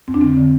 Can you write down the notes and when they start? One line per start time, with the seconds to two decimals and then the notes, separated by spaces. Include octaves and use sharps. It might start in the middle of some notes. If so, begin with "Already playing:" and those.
0.08 F2 C4
0.14 D4
0.21 D3 C4
0.37 D3